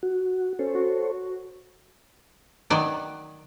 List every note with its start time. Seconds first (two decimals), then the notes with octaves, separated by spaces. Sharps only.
0.03 F#4
0.59 C#4 A4 C5 C#5
0.75 F#4
2.70 D#3 F#3 D5